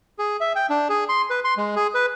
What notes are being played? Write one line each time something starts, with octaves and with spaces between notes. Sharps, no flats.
G#4
E5
G5
D4
G#4
C6
B4
C6
G#3
G#4
B4